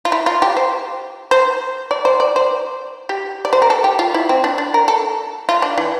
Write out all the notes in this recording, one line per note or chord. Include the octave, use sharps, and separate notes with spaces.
F4
E4
F4
G4
C5
C5
D5
C5
D5
C5
G4
D5
C5
A#4
A4
G4
F4
E4
C4
D4
D4
A#4
A4
F4
D4
E3